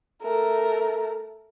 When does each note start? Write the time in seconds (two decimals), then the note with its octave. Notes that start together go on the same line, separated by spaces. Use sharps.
0.22 A3 A#4